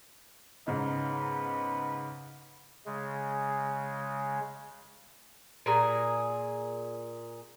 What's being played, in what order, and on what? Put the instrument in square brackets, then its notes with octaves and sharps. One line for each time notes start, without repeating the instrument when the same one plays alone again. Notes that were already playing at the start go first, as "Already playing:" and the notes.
[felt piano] G#2 C#3 D#4 [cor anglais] B3
[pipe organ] C#3 G#3
[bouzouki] A#2 G#4 A#5